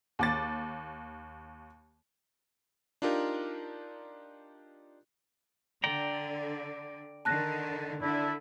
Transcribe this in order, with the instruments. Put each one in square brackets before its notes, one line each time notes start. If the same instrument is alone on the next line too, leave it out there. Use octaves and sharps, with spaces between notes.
[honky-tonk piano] D#2 D6 A6
[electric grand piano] D4 D#4 F4 G4 A#4
[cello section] D3 [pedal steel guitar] D5 G5 A#5
[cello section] D3 D#3 [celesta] A5 F#6 A#6
[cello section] D3 [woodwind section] D4 E4